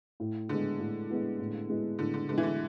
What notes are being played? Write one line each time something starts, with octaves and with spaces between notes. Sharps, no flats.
A2
D3 G#3 B3 E4
A2
G#3 B3 E4
A2
G#3 B3 E4
A2 D3
D3
D3 G#3 B3 E4
E3
D3